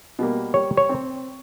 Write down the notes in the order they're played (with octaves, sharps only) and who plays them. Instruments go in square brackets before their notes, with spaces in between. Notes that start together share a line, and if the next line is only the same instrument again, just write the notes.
[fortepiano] B2 G3 A#3
[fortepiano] G3 [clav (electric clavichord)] C#5
[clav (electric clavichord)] C#5
[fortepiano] C4